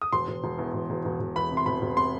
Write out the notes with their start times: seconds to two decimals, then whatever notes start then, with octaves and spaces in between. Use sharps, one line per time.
0.02 D#6
0.12 E1 C6
0.28 E1
0.44 E1
0.58 E2
0.74 E1
0.90 E1
1.05 E1
1.20 E1
1.36 E2 B5
1.51 C3
1.57 C6
1.66 E1 B5
1.82 E1
1.97 C3 C6